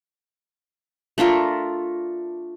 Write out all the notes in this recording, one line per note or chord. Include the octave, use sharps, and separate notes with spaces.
A3 D4 F4 A#4